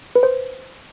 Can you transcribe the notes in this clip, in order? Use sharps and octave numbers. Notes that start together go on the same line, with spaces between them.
B4
C5